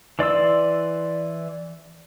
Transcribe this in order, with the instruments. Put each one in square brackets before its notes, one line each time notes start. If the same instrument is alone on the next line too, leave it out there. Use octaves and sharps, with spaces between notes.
[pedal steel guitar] E3 D5 C6 E6